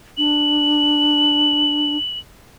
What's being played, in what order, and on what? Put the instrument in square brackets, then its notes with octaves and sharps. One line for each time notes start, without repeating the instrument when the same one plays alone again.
[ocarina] D4 [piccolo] F#7